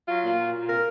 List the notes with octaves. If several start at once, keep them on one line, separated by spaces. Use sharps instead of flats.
F#3 F4
A#2
A#2
A#2
C3 A#4